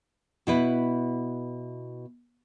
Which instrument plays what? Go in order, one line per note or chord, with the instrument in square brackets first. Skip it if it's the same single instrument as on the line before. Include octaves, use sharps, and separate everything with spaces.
[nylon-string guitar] B2 E4 B4